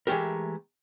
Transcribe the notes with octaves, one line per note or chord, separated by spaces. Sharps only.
E3 G#3 A3 G4 A#4